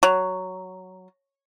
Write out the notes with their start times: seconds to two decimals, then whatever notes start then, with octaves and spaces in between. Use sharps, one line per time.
0.03 F#3